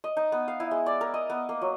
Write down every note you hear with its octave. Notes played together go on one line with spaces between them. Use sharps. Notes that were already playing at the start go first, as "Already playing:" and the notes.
D#5
D#4
B3
F5
E4
G#3
D5
A#4
D#5
B3
A#3
F#3